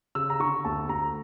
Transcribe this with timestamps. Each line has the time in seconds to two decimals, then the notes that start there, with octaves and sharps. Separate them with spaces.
0.15 C#3 E6
0.30 A#5
0.40 D3 C#6
0.65 D2 A5
0.89 D2 A#5